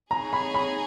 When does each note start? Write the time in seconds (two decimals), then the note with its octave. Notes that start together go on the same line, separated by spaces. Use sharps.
0.11 D#4 G#4 C#5 G#5 A#5
0.33 B5
0.54 B5